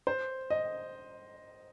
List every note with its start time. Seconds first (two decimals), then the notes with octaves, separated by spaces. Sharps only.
0.07 C5
0.50 D#5